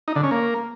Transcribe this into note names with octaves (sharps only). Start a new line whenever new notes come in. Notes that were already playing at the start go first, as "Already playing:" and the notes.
D#4
D3
C#4
A#3